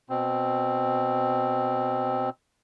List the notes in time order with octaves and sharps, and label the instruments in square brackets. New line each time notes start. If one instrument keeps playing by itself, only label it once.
[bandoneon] B2 C4